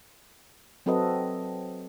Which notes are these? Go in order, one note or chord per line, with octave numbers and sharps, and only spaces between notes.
F#3 C4 F#4 A4 B4 D#5